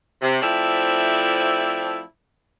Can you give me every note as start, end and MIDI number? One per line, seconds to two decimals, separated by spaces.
0.22 0.36 48
0.41 2.00 53
0.41 2.00 57
0.41 2.00 60
0.41 2.00 64
0.41 2.00 74
0.41 2.00 76